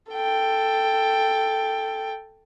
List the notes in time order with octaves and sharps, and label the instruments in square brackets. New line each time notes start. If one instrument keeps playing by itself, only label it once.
[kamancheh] A4 G5